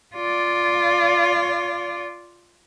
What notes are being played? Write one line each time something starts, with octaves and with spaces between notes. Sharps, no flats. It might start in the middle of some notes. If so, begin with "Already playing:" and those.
F4 D5